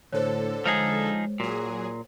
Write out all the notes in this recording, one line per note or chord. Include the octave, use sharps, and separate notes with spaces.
A2 D3 A4 C5 C#5
F3 G#3 D#4 G#4
A#2 F#3 G#4